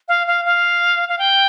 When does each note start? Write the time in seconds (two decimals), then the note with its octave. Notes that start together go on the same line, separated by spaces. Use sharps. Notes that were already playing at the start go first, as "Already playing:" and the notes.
0.08 F5
0.27 F5
0.45 F5
1.09 F5
1.19 G5